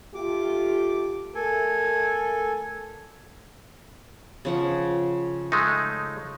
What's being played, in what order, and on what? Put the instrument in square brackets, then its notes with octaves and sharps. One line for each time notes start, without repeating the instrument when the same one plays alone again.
[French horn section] A3 F4 G4 [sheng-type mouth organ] D6
[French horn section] A3 A#4 [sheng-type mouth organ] A4 G#5
[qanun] C#3 F3 F#5
[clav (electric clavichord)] G#3 A3 D#4